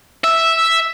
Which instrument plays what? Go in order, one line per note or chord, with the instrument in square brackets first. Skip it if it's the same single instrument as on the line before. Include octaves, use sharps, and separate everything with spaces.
[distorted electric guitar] E5 [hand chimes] E6